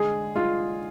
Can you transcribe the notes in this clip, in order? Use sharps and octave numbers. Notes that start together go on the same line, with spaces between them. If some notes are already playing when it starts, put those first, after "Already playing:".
Already playing: D3 G#3 G#4
G#3 F4